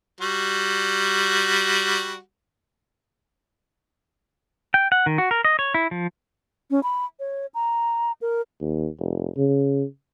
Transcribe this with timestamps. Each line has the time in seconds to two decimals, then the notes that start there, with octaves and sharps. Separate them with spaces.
0.21 G3 F#4
4.74 G5
4.92 F#5
5.06 D#3
5.18 F#4
5.31 A#4
5.45 D#5
5.59 C#5
5.74 E4
5.91 F3
6.71 C#4
6.83 B5
7.19 C#5
7.54 A#5
8.21 A#4
8.61 D#2
8.99 F1
9.37 C#3